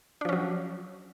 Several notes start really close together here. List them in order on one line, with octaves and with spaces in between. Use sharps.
D4 F3 C#4 F#3